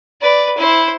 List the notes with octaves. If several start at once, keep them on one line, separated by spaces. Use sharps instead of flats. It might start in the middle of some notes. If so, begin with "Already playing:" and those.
B4 D5
E4 C5